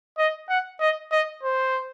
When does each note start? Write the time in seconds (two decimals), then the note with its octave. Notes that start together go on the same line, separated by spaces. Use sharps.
0.18 D#5
0.49 F#5
0.80 D#5
1.12 D#5
1.43 C5